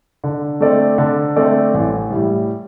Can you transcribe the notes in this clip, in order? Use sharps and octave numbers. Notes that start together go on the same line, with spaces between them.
D3
A3 C4 A4 D5
D3
A3 C4 A4 D5
A1
A2 G3